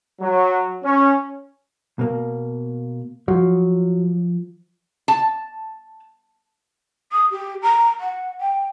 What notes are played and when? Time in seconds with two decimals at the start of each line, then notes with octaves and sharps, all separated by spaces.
0.21 F#3
0.84 C#4
1.99 B2 A#3
3.28 F3 F#3
5.08 A5
7.12 D#6
7.31 G4
7.62 A#5
8.00 F#5
8.41 G5